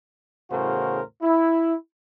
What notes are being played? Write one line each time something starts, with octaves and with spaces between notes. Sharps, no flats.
E2 A2 C#3 F#4 A#4 C5
E4